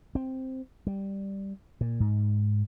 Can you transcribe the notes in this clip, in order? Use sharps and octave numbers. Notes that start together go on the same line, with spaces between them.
C4
G3
A#2
G#2